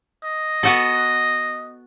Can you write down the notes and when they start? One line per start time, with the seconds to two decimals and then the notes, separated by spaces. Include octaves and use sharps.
0.24 D#5
0.63 B3 F#4 A4